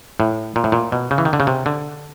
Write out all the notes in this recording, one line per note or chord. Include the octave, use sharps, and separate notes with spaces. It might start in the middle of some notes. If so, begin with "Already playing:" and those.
A2
A#2
A2
A#2
B2
C#3
E3
D#3
D3
C#3
C3
D3